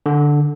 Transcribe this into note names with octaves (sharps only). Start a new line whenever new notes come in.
D3